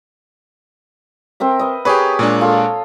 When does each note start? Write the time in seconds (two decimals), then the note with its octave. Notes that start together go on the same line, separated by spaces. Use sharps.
1.40 C4 A#4 E5
1.59 B4 D#5
1.85 G4 G#4 A#4 B4 C#5 D#5
2.19 A#2 G#3 D4
2.41 F4 A4